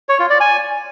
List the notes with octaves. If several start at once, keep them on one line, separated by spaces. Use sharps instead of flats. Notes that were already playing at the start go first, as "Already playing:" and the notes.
C#5
F4
D5
G#5